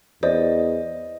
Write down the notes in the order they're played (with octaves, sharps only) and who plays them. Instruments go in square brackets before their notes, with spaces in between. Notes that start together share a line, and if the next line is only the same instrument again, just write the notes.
[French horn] E2 [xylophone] C5 D5 [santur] D#5